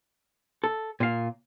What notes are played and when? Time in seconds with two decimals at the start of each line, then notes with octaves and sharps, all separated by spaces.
0.64 A4
1.00 A#2 F5